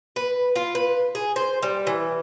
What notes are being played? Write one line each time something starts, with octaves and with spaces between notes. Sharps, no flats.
B4
F4
B4
G#4
C5
G3
E3